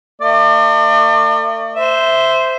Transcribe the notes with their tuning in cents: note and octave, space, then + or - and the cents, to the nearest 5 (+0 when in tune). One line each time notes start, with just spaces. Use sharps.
A3 +45 D5 +40
C5 -10 E5 +0